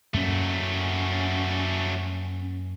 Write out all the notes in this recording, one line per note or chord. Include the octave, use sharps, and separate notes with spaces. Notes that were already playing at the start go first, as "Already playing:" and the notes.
F#2 F#3 A3 A#3 C#4